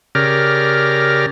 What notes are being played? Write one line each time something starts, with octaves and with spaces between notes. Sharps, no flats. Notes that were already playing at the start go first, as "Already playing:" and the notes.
C#3 G4 A#4 D5 F6